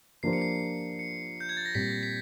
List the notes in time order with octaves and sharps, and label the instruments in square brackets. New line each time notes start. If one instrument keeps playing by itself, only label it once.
[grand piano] F3 A#3 D4 G4 C5 [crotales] C7
[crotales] C#7
C7
C#7
G6
G#6
A6
A#6
[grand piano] A#2 G3 C4 [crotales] B6
[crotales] B6